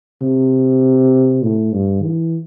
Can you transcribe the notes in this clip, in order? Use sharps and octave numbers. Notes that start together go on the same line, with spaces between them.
C3
A2
G2
E3